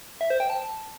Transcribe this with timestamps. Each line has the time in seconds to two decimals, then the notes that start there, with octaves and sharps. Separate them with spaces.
0.21 E5
0.30 C5
0.40 G5
0.50 A5